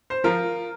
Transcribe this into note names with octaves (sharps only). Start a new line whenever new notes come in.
C5
F3 F4 A#4